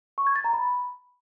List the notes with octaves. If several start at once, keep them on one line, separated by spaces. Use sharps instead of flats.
C#6
G#6
A6
A#5
B5